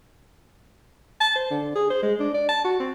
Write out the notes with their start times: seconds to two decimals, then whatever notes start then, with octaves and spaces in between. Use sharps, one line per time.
1.20 A5
1.35 C5
1.50 D3
1.75 G#4
1.90 C5
2.02 G#3
2.20 D4
2.34 D5
2.49 A5
2.64 F#4
2.80 C4